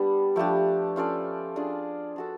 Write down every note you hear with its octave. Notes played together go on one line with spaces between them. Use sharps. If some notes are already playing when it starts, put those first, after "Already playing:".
Already playing: G3 B3 D4
F3 A3 D4 G4
C#4 F4 A4 D5
D4 F4 G#4
D4 F#4 A4